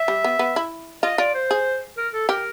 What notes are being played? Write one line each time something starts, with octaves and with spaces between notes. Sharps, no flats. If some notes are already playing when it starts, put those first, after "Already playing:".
Already playing: E5
G3
B3
B3
E4
F4 D#5
F4 D5
C5
G#4
A#4
A4
G4 A#4